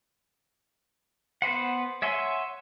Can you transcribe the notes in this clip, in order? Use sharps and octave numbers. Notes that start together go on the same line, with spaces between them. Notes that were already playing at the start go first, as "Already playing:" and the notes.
B3 B4 C5 F#5
C#5 E5 F#5 G#5 C6